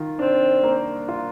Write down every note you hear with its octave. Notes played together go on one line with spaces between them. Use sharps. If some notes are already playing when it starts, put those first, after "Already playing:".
Already playing: D#3 F4
C4 D4
A#3
F4